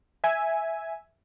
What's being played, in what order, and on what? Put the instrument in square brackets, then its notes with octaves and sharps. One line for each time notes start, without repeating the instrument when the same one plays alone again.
[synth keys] E5 G#5